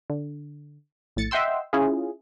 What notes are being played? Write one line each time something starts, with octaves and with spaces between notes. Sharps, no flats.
D3
A#1 A2 A6 C#7
D#5 E5 F#5 G5 C6 E6
C#4 E4 F4 G#4